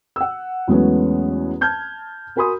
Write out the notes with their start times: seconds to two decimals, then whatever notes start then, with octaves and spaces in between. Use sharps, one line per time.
0.16 F#5 E6
0.68 E2 F#3 G#3 A3 B3 C#4
1.61 A5 F6 G6 G#6
2.36 F#4 A#4 G#5 B5 C6 D#6